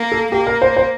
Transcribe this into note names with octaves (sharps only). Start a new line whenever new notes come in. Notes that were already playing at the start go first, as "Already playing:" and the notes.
Already playing: A#3
A4
A#3 G4
A#4
C5
C5